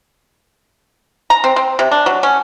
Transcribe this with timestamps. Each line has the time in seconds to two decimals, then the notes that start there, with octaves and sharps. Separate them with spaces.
1.30 A#5
1.44 C4
1.56 C4
1.79 C3
1.91 D4
2.06 F#3
2.23 C#4